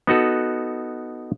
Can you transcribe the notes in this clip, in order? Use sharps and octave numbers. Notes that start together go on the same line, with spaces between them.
B3 D#4 F#4 A4